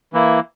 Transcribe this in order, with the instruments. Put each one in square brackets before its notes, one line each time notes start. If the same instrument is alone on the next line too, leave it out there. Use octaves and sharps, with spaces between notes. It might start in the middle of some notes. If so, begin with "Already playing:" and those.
[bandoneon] E3 A#3 E4